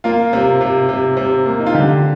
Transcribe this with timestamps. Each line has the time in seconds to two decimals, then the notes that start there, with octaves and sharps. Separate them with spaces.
0.04 A#3 F4
0.33 C3
0.61 C3
0.89 C3
1.17 C3
1.46 A#3
1.59 D#4
1.66 F4
1.74 D3 G4